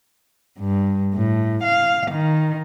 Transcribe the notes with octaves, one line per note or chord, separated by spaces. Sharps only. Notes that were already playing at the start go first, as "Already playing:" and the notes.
G2
A2
F5
D#3